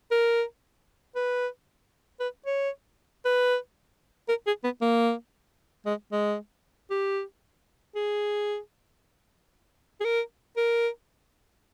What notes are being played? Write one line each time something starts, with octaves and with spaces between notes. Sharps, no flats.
A#4
B4
B4
C#5
B4
A#4
G#4
B3
A#3
G#3
G#3
G4
G#4
G#4
A#4
A#4